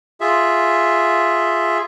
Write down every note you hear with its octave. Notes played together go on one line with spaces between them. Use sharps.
F4 G#4 E5